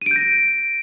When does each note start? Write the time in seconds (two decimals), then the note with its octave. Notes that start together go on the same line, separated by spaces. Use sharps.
0.02 D#7
0.06 D7
0.11 G6
0.16 A#6